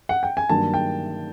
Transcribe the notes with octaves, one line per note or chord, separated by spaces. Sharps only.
F#5
G5
G#5
G2 D#3 F#3 A#3 A5
G5